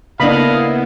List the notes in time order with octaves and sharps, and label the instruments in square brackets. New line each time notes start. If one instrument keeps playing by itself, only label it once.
[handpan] C#3 A#3 [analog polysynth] B3 E4 [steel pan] D4 B5 [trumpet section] D#5 F5